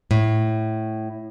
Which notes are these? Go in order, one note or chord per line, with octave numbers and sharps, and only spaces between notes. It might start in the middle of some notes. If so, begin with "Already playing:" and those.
A2